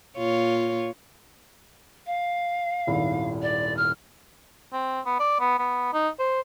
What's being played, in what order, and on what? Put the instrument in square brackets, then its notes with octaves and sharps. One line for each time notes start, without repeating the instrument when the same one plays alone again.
[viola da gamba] A#2 F4 C#5
[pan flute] F5
[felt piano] D#1 G#1 E4
[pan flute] D5
F6
[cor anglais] C4
B3
D5
B3
B3
D#4
C5